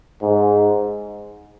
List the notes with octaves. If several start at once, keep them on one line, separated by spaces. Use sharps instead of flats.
G#2